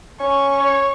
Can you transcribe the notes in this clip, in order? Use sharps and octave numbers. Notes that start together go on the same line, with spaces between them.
C#4 C#6
C#5